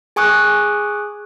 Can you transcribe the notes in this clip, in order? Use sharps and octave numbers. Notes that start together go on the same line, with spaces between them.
G#4 G#5 C#6 D#6 F#6